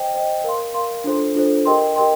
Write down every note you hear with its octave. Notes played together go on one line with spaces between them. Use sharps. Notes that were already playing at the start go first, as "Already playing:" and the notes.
Already playing: C5 D#5 G5
C5 D#5 G5
A#4 F5 C6
A#4 F5 C6
D4 F4 A4 C5
D4 F4 A4 C5
G4 A#4 D#5 G5 C6
G4 A#4 D#5 G5 C6